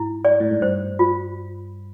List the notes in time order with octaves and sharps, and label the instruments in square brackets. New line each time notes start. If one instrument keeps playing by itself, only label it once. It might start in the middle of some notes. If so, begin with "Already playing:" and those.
Already playing: [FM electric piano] G#2 [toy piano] E4
[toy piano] D5
[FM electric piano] A2
G#2
[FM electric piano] G2 [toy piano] C5
[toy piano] F4